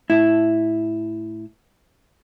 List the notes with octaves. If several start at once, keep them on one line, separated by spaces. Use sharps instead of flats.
A2 E4